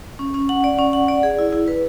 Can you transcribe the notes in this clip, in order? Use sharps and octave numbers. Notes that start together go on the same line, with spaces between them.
C#4
C#4
F#5
D5
C#4
F#5
D5
G#4
E4
E4
B4